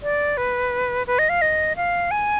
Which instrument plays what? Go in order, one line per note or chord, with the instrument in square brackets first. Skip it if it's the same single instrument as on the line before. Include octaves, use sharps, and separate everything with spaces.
[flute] D5
B4
B4
D#5
F5
D#5
F5
G#5